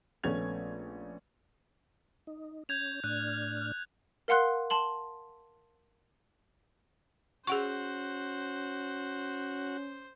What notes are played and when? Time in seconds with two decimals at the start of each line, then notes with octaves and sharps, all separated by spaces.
0.24 A#1 A3 B3 C#4 G#6 F7
2.27 D#4
2.69 C#4 G6 G#6 F7
3.04 A2 D4 F6 F#6
4.28 A#4 F5 F#5 C6 F#6
4.70 A5 C6 F#7
7.47 C#4 F#4 G#4 C5 F#5 C#6